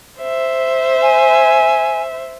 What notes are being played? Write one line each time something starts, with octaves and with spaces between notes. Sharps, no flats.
C5 E5
G#5